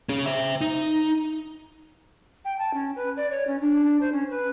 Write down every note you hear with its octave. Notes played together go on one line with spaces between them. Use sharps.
C#4 G#4
C5 E5
D#4
G5
A5
C#4
B4
D5
C#5
C#4
D4
C5
C#4
B4